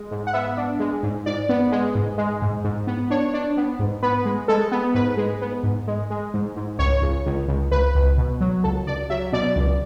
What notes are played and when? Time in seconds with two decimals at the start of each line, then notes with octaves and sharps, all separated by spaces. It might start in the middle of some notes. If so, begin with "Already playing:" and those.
Already playing: G#3
0.11 G#2
0.27 F#5
0.33 B3 E5
0.57 D4
0.80 G#3
1.03 G#2
1.26 G#2 D5
1.49 B3
1.72 G#3
1.95 G#2
2.18 G#3
2.42 G#2
2.64 G#2
2.87 B3
3.10 D4 C#5
3.34 D4
3.57 B3
3.79 G#2
4.03 B3 B4
4.25 G#3
4.48 G#3 A4
4.72 B3
4.95 G#2 B4
5.17 G#3
5.41 B3
5.63 G#2
5.87 G#3
6.10 G#3
6.34 G#2
6.56 G#2
6.79 C#2 C#5
7.02 C#2
7.26 C#2
7.48 C#2
7.71 C#2 B4
7.95 C#2
8.18 B2
8.41 F#3
8.64 C#2 A4
8.87 C#2 D5
9.10 F#3 E5
9.33 B2 D5
9.56 C#2